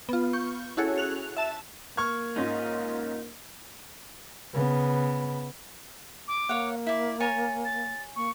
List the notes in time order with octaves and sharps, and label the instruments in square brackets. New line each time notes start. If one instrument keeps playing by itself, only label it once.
[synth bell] B3 F4
C#6 G6
C#4 E4 F#4 G#4 A4 C#5
F#6 F7
E5 A5 E7
[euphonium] A#3 [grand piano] C#6 F6 G#6
[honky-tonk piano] G#2 C#4 F4 [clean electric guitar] D#4
[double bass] C#3 B3
[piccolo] D6
[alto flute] A#3 [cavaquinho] C#5 F5 F#5
[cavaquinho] E4 D5 [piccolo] B6
[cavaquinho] C#5 G#5 A#5 [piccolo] A6
[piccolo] A6
[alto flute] A#3 [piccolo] C#6